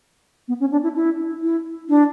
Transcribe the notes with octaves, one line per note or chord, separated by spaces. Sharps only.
B3
C#4
D4
E4
E4
E4
D4